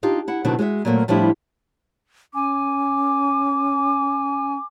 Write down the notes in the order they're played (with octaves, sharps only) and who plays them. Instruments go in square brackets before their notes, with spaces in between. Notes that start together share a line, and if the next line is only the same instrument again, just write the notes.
[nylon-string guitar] D4 D#4 F4 G4
E4 F#5
B2 D3 D#3 F#3 C4 D#4
G#3 F#4 D5 E5
A#2 F#3 A3 A#3 C4
A2 F3 G3 D4 E4 G4
[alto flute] C#4 [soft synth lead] G#5 [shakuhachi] D6